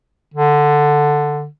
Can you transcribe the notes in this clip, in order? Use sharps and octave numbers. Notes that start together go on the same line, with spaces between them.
D3